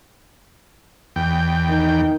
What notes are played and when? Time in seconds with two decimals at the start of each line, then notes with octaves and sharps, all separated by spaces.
1.16 E2 G5
1.69 D#3